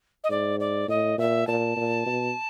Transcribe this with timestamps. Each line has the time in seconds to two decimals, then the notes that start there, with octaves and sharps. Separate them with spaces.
0.24 D#5
0.30 G#2 D5
0.60 D5
0.88 A2 D#5
1.18 A#2 E5
1.47 A#2 A5
1.76 A#2
2.06 B2